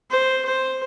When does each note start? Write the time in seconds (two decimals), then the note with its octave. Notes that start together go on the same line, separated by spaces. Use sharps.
0.10 C5
0.45 C5